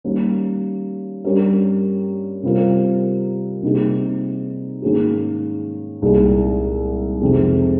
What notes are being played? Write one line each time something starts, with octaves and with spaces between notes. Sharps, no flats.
D#3 G3 A#3 C#4
G2 G3 C#4 G4 A#4
C3 G3 C4 F4 A#4
C3 G3 A#3 D#4 G#4
G#2 D#3 A#3 C#4 G#4
C2 A#2 G#3 D#4 G#4
F2 C3 D#3 G#3